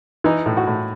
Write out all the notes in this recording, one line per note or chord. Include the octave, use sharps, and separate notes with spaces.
E3 D#4
A2
F#4
A2